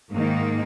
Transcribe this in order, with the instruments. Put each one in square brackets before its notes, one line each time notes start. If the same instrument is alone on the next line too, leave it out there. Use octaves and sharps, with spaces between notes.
[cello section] G#2 D#3 A#3